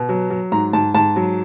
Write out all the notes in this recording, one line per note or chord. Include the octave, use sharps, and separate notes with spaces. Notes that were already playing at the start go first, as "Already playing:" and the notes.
Already playing: B2
F#3
F#3
G#2 A#5
G#2 A5
G#2 A5
F#3